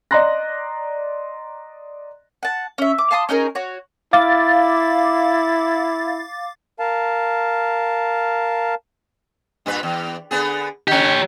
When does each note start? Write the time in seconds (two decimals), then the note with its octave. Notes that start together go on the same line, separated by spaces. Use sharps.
0.11 D5 D#5 A#5 C6 F#6 A#6
2.43 F#5 A5
2.78 C#4 E5
2.98 D6
3.11 F5 A5 C6 D#6
3.29 C#4 D#4 G#4 A#4
3.55 F#4 C#5
4.13 E4 F5 D6 A6
6.80 A#4 F5 A5
9.66 G2 A#2 B4
9.83 E2
10.31 D3 B3 G#4
10.88 D3 C#4 G4 C#5